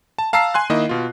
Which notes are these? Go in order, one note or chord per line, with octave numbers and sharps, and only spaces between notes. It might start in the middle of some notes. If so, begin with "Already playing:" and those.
A5
F5 A5 A#5 E6 C7
G#5 C6 F#6
D#3 A#3 E4 D#5
B2 F4